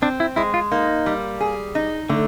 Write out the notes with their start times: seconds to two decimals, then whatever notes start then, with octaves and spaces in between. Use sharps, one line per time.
0.02 C4 D4
0.20 E4
0.36 G#3 E4
0.54 F4
0.72 A#3 D#4
1.06 G3
1.40 G#4
1.75 D#4
2.09 D3 A3